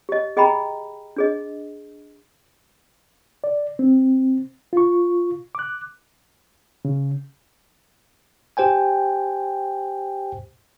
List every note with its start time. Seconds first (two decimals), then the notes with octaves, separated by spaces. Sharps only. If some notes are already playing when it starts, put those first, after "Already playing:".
0.09 G4 D#5
0.37 G#4 D#5 G5 G#5 A#5 B5
1.16 D4 G#4 D#5
3.44 D5
3.79 C4
4.73 F4 C#6
5.55 D6 F#6
6.85 C#3
8.57 G4 C5 G5 G#5